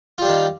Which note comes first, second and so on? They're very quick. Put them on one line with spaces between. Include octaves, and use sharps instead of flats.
F4 G3 D4 D#3